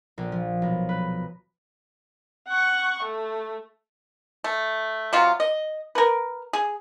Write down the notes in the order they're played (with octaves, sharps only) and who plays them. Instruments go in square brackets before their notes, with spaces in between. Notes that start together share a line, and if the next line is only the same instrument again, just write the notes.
[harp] A#1
F3
B1
B4
[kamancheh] F#5 C#6
A3
[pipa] A3
C3 F#3 F4
D#5
A#4 B4
G#4